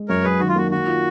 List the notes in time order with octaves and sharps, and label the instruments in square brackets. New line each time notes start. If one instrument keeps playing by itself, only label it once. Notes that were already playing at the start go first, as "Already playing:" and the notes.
Already playing: [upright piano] G#3
[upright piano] F#2 [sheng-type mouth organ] A#4 C#5
[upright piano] F#2 [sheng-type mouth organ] G#4 B4
[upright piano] D#3 [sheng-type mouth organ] F#4
[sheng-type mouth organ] F4
[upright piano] A#3 [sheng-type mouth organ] F#4
[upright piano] D#3 [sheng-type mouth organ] F#4
[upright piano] F4